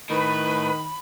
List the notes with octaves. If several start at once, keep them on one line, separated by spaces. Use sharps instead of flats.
A2 D#3 B4 B5